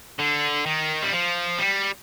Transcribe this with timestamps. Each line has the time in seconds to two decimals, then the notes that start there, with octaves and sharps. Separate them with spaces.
0.19 D3
0.66 D#3
1.03 G3
1.12 F3
1.58 G3